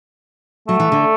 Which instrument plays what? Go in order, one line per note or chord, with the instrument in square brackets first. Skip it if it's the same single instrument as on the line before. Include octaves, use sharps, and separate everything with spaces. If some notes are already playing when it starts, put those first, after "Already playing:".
[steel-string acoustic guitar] F#3 [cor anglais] A3
[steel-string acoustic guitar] E3
D3